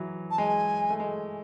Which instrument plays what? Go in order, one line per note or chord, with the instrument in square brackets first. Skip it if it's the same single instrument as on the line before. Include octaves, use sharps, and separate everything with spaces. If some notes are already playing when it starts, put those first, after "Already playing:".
Already playing: [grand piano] E3 F#3
[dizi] A5
[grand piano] G#3 [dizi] G#5
[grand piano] A3
G#3